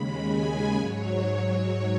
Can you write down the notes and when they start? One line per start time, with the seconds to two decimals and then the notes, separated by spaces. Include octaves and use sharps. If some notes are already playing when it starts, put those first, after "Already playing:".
Already playing: D#2 C#3 G#3 B5
0.29 G#5
0.75 G#2 F#3 C#5